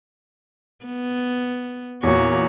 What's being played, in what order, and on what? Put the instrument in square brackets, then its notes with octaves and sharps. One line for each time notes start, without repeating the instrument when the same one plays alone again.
[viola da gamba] B3
[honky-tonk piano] E2 A#2 [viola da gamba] F#4 C#5